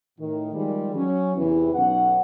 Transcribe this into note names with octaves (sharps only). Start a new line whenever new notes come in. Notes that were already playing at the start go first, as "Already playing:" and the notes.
A2 D#3
D#3 F3 G3 G#3
F#3 C#4
E2 C3 E3
B1 C#4 F#5